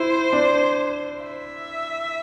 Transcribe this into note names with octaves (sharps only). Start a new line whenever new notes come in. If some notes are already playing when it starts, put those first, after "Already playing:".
Already playing: E4 C5
D4
E5